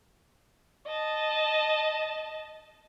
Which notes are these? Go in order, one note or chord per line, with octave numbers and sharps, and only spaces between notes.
D#5 A5